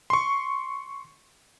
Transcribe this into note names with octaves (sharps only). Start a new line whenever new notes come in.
C6 C#6